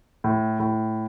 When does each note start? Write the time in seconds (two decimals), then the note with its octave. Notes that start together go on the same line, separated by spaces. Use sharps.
0.24 A2
0.60 A2